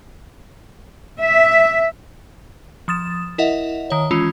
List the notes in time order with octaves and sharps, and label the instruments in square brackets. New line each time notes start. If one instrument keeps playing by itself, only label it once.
[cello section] E5
[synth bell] F3 D#6 A6 E7
E4 A#4 D#5 E5 F#5
D#3 C#5
E3 G#3 C#4 F4